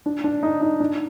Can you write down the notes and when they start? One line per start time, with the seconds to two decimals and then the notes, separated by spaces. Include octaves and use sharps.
0.06 D4
0.24 D4
0.43 D#4
0.61 D#4
0.80 D4